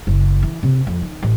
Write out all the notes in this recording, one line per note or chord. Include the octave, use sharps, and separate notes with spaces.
F#1
E3
C3
F2
D#3
A1